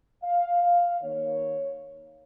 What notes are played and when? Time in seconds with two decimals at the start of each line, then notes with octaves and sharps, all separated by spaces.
0.24 F5
0.62 F5
1.01 D#3 A#3 C#5